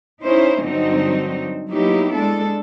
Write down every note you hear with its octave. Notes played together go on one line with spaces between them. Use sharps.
C#4 D#4 E4 C5
G2 D3 F#3 C4 D#4
F#3 A#3 B3 D#4 E4 G4
G#3 D4 A4